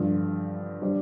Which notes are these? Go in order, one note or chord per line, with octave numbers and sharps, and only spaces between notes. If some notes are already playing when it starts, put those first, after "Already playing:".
Already playing: G2 D3 F3
G3 D4 G4 C5